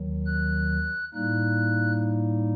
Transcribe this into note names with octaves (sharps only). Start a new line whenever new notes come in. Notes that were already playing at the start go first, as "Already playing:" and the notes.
Already playing: D#2 D#3 F#3
F#6
A2 G3 A#3 D#4 F#6